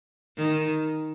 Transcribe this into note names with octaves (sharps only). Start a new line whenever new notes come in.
D#3